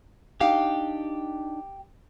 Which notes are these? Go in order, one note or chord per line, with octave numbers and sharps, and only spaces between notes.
D4 D#4 G4 F5